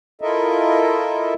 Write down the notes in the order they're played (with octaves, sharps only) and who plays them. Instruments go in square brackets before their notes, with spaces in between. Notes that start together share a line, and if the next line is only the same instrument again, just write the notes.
[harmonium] E4 F4 A4 A#4 D#5 E5